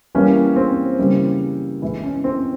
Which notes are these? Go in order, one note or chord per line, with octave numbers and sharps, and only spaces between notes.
E3 G3 A#3 C#4
C4
C#3 E3 G3 A#3
E3 G#3 E4
C#4
C4